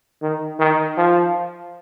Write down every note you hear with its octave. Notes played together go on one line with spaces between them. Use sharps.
D#3
D#3
F3